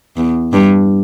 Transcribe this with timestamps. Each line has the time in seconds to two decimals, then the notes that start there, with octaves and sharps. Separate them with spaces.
0.17 E2
0.53 G2